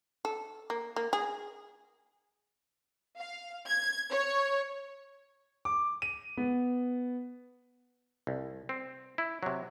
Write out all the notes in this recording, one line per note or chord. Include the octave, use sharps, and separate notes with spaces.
A4
A#3
A#3
G#4
F5
G#6
C#5
D6
D#7
B3
C2
C4
E4
C3 F#3